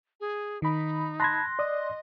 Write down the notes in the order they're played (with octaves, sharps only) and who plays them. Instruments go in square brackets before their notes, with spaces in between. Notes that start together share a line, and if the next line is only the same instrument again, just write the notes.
[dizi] G#4
[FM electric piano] D#3 B5 [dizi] D#4
[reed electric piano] A5 B5 G#6 [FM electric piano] C6 [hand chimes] F#6 A#6
[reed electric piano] D5 D#6 [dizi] D#5